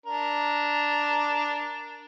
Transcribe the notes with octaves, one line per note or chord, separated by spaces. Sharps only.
D4 A#4